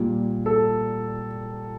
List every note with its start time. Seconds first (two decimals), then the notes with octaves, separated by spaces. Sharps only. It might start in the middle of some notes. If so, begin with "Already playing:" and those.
Already playing: A#2 G3
0.46 A4